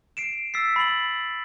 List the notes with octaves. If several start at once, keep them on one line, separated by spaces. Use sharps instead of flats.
C7 D7 E7
E6 A6 B6 C7
B5 E6 A6 C7 F#7